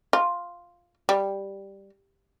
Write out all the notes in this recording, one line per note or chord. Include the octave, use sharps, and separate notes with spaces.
F4
G3